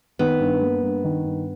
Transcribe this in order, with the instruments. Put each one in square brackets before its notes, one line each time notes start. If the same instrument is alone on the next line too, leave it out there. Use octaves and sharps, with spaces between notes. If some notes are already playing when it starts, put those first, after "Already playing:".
[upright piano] D#3 [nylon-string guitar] B3
[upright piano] G2
A#3
G2
D#3
G2